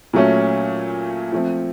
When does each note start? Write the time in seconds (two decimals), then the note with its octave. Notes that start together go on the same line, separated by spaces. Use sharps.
0.13 A#2 F#3 A3 C#4
1.33 F3 A3 C4